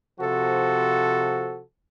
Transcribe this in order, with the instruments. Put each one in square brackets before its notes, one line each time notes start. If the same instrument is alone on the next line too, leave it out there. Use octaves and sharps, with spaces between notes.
[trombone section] C3 F3 F#4 A4